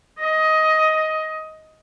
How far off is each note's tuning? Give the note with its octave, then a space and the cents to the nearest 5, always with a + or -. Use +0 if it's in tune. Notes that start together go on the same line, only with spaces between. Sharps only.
D#5 +15